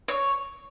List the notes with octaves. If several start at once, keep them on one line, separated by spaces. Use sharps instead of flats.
C#5